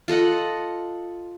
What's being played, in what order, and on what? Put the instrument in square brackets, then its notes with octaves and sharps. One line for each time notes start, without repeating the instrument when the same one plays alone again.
[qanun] F4 A4 D#5 F#5